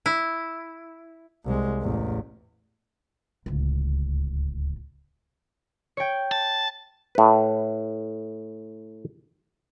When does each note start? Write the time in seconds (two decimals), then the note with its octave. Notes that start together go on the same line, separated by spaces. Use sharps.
0.06 E4
1.45 C2 G#3
1.81 A1 E2
3.46 D1 C#2
5.97 C#5 G5
6.32 A5
7.15 A2 B4